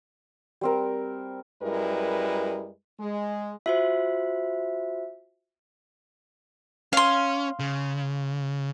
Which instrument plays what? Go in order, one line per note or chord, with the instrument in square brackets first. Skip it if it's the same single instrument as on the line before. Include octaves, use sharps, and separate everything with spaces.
[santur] G3 C4 A#4
[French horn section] F#2 G3 G#3 E4 A#4 B4
G#3
[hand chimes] F4 F#4 C5 [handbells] E5
[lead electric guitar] C#4 [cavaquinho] F5 C6
[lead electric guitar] C#3